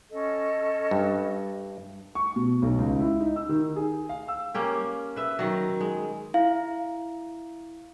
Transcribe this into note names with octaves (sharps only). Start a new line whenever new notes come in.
C#4 A4 D#5
G2
C#6
B2
B1
C#2
E4
D#4
E6
D#3
G#4
F5
E6
A#3 C#4 G4
B4 E5
D#3 F#3
G#3
E4 F5